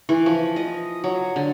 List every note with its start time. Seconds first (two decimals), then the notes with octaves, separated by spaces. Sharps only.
0.09 E3
0.26 F3
0.56 D#5
1.04 F#3
1.36 D3